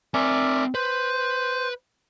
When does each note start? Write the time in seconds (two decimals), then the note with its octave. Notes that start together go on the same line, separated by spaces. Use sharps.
0.14 C4 A#4 D5 E5 G#5
0.75 B4 C5